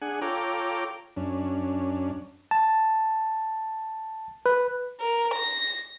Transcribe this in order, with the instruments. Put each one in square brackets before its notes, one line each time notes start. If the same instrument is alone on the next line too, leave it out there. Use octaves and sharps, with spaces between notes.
[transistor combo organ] D4 G#4 F#5 G#5
F4 A4 C#5 G5 A#5 D6
F#2 C#4 D4
[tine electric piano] A5
B4
[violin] A#4
A#6